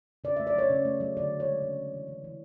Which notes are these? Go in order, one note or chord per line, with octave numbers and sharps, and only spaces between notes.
C#3 D5
E5
A3
D5
F#3 C#5
C#3
A3
F#3
D3 D5
B3
C#5
G#3
C#3
B3
E3
E3
E3